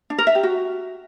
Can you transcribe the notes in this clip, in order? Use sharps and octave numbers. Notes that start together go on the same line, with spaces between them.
D4
A#4
E5
G4
F#4